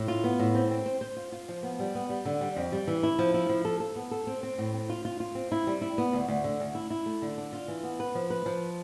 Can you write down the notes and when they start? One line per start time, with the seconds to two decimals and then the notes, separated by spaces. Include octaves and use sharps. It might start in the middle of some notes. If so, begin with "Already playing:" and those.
Already playing: A2
0.08 F4
0.24 B3
0.40 A2
0.55 C4
0.71 C4
0.86 C5
1.01 C5
1.17 F4
1.32 F4
1.49 F3
1.63 B3
1.79 G3
1.95 B3
2.10 G3
2.25 D3
2.41 G3
2.56 F2
2.72 G3
2.87 E3
3.03 E4
3.19 F3
3.34 E4
3.49 F3
3.65 A4
3.80 A4
3.96 B3
4.11 A4
4.27 C4
4.43 C4
4.58 A2
4.74 C4
4.90 F4
5.05 F4
5.20 F4
5.35 C4
5.52 E4
5.67 G3
5.81 E4
5.98 B3
6.13 D2
6.28 D2
6.44 D3
6.60 D2
6.75 E4
6.90 E4
7.06 A3
7.22 D3
7.38 D4
7.53 F4
7.68 E3
7.83 B3
8.00 B4
8.15 F3
8.30 B4
8.46 F3